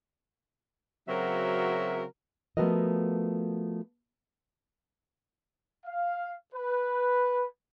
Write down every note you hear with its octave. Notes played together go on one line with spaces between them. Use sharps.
C#3 F#3 C4 F#4 A#4 E5
F3 A3 B3 F#4 A#4 D#5
F5
B4